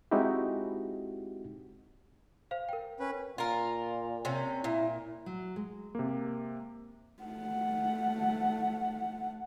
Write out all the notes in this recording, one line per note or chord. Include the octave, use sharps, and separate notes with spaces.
G#3 C4 D#4 E4 F#4 G4
C5 F5
A#4 G5
C#4 B4
A#2 F4 A#4
C3 C#4
A#2 E4
F#3
G#3
C3 A#3
A3 F#5